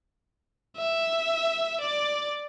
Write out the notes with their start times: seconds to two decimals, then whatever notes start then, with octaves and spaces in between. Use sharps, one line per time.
0.77 E5
1.80 D5